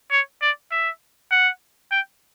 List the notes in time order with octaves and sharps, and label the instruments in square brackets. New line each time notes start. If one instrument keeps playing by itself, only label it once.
[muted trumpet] C#5
D5
E5
F#5
G5